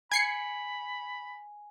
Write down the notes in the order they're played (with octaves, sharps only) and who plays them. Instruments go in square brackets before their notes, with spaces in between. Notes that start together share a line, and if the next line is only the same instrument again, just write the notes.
[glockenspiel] G#5 [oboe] B5 [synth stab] G#6 C7 C#7